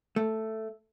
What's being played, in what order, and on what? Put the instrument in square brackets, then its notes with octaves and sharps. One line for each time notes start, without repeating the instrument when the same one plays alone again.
[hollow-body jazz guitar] A3